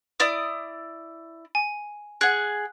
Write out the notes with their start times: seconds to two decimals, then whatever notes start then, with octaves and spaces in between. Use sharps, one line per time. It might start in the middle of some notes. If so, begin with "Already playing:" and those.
0.20 E4 D5 D#6
1.55 G#5
2.21 G#4 F#5 F#6